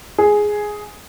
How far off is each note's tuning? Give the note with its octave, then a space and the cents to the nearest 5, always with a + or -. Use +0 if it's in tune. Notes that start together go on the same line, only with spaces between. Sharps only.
G#4 +5